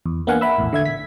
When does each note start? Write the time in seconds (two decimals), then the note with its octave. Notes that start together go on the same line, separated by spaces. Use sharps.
0.06 E2
0.27 A#3 B3 D4 F5 F#5 G#5
0.41 E5 B5 E6
0.58 A#1 E2 A2
0.73 D3 E5 G#6
0.85 B6